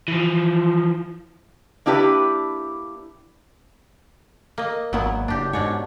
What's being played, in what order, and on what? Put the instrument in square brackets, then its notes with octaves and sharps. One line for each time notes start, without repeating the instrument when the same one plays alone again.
[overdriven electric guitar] E3 F3
[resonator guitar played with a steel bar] A#3 D4 E4 G4 B4
[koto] A#3 D#5
[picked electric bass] G#1 A#3 [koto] F#3 B3 E4
[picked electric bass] F#1 [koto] D4 G4
[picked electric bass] G#2 [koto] B2 D4 C#5